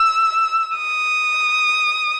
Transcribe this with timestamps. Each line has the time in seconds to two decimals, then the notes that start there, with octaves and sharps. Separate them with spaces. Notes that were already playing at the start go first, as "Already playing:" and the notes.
Already playing: E6
0.78 D#6